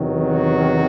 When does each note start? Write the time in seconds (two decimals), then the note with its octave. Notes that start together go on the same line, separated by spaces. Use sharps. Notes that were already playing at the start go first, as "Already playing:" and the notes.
Already playing: E2 C3 D#3 F#3
0.22 F#4